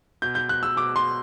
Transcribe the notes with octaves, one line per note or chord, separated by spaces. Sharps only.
B2 G6
G6
F#6
E6
B2 D6
C6